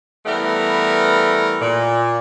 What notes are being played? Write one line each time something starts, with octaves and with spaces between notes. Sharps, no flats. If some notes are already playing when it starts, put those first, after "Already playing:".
E3 G3 A3 B3 A#4
A#2